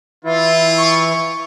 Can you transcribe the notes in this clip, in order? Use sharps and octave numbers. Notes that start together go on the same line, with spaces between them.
E3 E4 F4
C#6